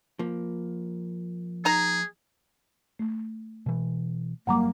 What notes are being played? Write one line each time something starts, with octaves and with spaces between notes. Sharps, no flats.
F3 A#3
D#4 G#4 A#5
A3
B2 E3
G1 F#3 G3 A#3 F#5 A#5 D6